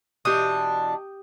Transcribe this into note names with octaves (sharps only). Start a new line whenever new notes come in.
B2 E3 D4 G4 D#6